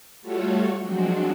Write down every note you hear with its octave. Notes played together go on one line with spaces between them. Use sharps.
G3 A3 F4 F#4 A4 C#5
F3 F#3 G#3 C4 D4 F#4